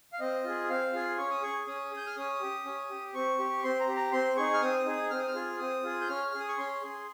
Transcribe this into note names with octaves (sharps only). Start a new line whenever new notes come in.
F5
C4 D#5
F4 G#4
C4 F5
F4 G#4
C#4 C#6
D#6
G#4 C#6
C#4 D#6
G#4
G6
F6
C#4 D#6
G4
C#4
G4
C4 C#6
G4
C4 C6
A#5
G4
A#5
C4 C6
D#4 G#4 C#6
F6
C4 D#6
D#4 G#4
C4 F6
D#6
F6
F4 G#4
C4 D#6
F4 G#4
G6
C#4 F6
G#4 F6
D#6
C#6
C#4 C6
G#4